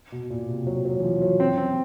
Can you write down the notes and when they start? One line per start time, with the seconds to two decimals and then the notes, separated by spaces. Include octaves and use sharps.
0.12 B2
0.30 A#2
0.49 C3
0.67 F#3
0.85 F#3
0.99 E3
1.04 F3
1.21 F#3
1.40 C4
1.58 C4